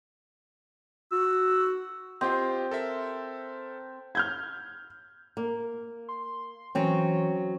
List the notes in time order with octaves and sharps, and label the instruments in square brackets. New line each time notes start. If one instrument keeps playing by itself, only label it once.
[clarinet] F#4 [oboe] E6
[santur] C4 [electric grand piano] F4 G4 D#5
[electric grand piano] A4 A#4 E5
[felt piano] F6 G6 G#6
[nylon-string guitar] A#3
[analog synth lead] C6
[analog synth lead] E3 [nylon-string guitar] F#3 C4 C#4